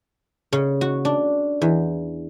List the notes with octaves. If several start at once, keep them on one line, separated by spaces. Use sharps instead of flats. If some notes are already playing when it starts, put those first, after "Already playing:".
C#3
F#4
D4
E2